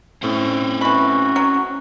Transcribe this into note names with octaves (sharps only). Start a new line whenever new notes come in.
A2 C4 C#4 C5 C#5
E3 F#4 B5
F#3